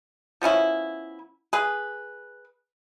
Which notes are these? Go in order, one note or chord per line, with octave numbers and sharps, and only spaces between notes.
F3 B3 C#4 E4
G#4 B4